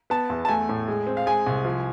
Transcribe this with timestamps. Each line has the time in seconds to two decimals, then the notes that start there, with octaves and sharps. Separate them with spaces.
0.10 B3 A5
0.30 E2
0.45 A5
0.49 A3 G#5
0.69 A2
0.88 G#3
1.07 C4
1.17 F5
1.26 G#3 G#5
1.47 C2
1.65 F3